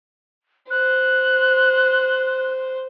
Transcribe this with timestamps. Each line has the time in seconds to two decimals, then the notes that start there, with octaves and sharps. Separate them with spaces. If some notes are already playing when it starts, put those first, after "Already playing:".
0.70 C5 F#6